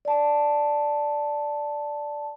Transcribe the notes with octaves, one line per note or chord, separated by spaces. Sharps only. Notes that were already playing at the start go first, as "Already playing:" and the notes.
D5 A5